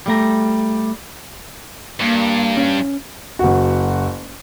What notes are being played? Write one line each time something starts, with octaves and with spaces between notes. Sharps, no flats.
G3 A3 A#5
G2 A#3
C#4
F#1 F#4